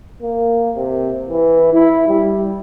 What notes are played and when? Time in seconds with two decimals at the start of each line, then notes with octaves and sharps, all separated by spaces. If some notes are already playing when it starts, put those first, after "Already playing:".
0.22 A#3
0.76 C3
1.30 E3
1.74 E4
2.08 G3